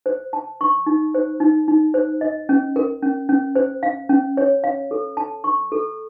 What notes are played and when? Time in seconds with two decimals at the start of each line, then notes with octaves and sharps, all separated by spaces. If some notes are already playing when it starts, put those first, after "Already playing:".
0.06 C5
0.33 A5
0.61 C#6
0.86 D#4
1.15 C5
1.40 D#4
1.68 D#4
1.94 C5
2.21 D#5
2.49 C#4
2.76 A#4
3.02 C#4
3.29 C#4
3.55 C5
3.83 F5
4.09 C#4
4.37 C#5
4.64 F5
4.91 A4
5.17 A5
5.44 C#6
5.72 A4